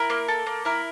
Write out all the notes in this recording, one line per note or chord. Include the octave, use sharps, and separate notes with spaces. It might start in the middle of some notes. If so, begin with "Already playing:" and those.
Already playing: E4 A#4
A#3
A4
A#3
E4 A#4